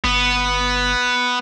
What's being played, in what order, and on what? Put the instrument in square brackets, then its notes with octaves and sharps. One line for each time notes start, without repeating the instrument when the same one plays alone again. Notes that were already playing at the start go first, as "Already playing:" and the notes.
[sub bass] G1 [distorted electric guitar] B3